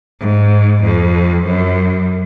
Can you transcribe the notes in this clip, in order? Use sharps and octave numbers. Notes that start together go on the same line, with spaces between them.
G#2
F2
F#2